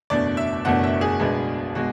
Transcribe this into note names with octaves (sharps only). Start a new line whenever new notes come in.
F#1 E2 B2 A3 D4 D5
E5
F#1 E2 B2 A3 D4 F#5
E5
G#4
B1 B2 G#3 B3 D4
B2 G#3 F#4